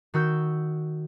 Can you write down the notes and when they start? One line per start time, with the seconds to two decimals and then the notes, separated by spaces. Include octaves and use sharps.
0.14 D#3 F#4 E6 G6